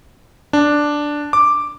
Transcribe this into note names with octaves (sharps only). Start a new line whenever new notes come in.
D4
D6